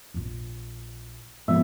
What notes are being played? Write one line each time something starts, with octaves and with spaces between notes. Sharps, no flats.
A#1 F4
G#2 B2 F3 B3 E5